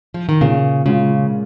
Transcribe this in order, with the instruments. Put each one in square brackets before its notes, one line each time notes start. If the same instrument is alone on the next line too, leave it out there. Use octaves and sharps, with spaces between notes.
[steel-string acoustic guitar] F3
D#3
[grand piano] A#2 [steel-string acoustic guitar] C#3
[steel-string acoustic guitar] C#3 [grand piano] G#3 F4